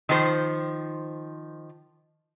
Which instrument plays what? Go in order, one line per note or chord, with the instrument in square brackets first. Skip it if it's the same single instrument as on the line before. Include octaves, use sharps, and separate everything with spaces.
[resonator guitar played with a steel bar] D#3 F3 C5